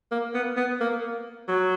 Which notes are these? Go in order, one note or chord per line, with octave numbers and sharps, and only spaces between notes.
A#3
B3
B3
A#3
F#3